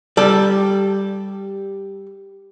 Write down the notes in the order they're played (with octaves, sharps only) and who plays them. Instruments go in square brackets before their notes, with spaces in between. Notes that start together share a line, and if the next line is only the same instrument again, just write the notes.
[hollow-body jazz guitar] G3 A4